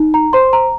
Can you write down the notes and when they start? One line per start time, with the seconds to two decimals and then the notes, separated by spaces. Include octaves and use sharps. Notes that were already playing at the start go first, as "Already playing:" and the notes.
Already playing: D#4
0.14 A#5
0.33 C5 C6
0.53 A#5